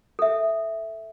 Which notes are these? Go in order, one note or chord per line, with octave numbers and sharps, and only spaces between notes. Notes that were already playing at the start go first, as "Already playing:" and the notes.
A4 E5